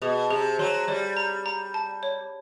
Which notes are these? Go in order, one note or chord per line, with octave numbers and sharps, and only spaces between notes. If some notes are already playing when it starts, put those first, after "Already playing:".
B2 G#4
C3 G#4
F#3 C6
G3 C#5
A#5
A#5
A5
C#5